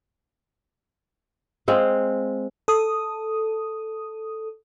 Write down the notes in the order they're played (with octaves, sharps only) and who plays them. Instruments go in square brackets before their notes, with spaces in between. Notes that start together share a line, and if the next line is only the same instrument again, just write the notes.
[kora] G#3 C4 F5
[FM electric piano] A4 D#6